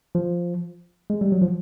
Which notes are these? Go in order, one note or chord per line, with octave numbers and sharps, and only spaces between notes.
F3
G#3
G3
F#3
F3